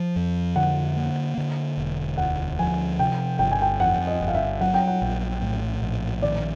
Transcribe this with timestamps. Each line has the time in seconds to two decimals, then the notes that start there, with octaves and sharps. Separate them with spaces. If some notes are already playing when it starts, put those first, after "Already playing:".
Already playing: F3
0.16 F2
0.56 D3 F#5
0.97 A#3
1.37 D3
1.77 E1
2.17 D2 F#5
2.59 F3 G#5
2.99 C3 G5
3.39 G1 G5
3.51 G#5
3.62 G5
3.80 F2 F#5
4.07 D#5
4.21 G1
4.28 F5
4.35 E5
4.61 F#3 F#5
4.74 G5
4.87 F#5
5.02 A#1
5.42 A2
5.82 A#1
6.22 D#3 D5